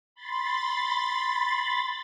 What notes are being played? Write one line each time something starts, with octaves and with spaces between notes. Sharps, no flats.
B5 C6 A6